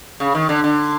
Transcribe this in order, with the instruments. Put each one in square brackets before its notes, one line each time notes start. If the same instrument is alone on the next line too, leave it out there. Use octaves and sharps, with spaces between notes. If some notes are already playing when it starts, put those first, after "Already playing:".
[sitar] C#3
D#3
D3
D3